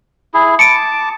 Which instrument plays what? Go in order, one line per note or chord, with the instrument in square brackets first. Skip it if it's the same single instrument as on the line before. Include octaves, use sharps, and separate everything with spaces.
[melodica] E4 G#4
[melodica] A5 D6 [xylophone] C#7 D7